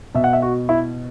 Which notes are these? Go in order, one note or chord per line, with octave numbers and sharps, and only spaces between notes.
B2 E5
F#5
E5
F#4
E4